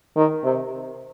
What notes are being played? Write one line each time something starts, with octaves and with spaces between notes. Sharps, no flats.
D#3
C3